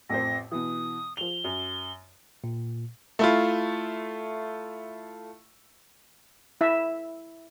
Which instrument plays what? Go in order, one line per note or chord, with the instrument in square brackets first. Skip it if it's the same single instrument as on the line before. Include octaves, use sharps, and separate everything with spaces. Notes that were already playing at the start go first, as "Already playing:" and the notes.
[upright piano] A1 F2 C5 [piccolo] A#6
[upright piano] B2 E3 [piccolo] D#6
[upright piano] F3 F7 [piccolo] G7
[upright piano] F#2
[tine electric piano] A#2
[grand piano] A3 E4 F4
[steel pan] E4 E5